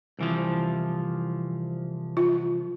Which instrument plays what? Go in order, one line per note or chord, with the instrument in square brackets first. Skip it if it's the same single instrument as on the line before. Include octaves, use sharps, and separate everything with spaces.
[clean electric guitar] C2 E3 F3
[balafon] F4